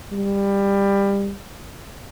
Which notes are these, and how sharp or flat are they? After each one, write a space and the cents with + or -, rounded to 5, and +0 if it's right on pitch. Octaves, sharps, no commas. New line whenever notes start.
G3 +20